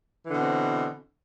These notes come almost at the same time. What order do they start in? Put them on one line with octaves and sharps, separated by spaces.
E3 D3 B2 C4